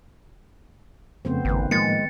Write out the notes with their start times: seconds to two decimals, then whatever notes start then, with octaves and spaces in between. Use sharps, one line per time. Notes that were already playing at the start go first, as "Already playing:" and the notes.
1.25 F2 C#3 A3 B3 C4 C5
1.45 G#1 D#3 B4
1.71 A2 F3 G#3 A#3 A6 C#7